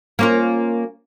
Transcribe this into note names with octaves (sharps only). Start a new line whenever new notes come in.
A#3 C#4 F4